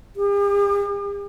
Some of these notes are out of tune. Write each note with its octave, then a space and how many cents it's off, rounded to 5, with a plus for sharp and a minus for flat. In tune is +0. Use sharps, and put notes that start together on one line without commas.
G4 +45